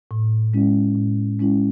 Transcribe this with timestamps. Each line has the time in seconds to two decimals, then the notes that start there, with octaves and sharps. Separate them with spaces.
0.11 A2
0.54 G#3 C#4 E4
0.96 A2
1.39 G#3 C#4 E4